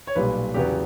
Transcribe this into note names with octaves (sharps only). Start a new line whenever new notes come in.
C#5
B1 A#2 G3 B4
E2 C#3 F#3 B3 G4